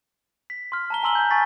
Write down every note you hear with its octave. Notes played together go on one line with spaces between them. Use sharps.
B6
C6 F6
A5 A#5 G7
G#5 A#5 C6 E6 F#7 G7
G6
G#5 A5 C#6 A6 B6